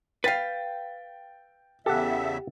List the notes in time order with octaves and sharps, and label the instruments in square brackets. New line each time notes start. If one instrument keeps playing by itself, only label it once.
[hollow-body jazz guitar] B4 F5 [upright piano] G5 A6
[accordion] E2 C#3 E5 [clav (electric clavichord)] G4 F#5 [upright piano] A4